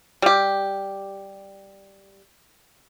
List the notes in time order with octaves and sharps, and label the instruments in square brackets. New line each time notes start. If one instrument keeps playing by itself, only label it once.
[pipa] G3 G4